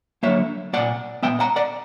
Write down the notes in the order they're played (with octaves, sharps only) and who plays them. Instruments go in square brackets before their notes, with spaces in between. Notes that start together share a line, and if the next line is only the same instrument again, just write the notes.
[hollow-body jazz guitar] D3 F#3 A#3 C#5 E5
A#2 A#3 D5 F#5
A#2 F#3 B3 E5 G5
F#5 A#5
D5 F#5